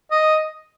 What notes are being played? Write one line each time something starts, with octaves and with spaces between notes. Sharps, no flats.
D#5